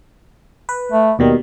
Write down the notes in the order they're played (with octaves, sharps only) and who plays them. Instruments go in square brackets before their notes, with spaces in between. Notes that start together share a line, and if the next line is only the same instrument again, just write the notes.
[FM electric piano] B4
[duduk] A3
[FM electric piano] D#2 B2 G3 [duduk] D#3